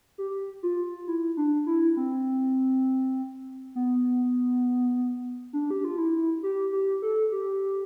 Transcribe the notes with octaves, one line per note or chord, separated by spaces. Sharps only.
G4
F4
E4
D4
E4
C4
B3
D4
G4
F4
E4
G4
G4
A4
G4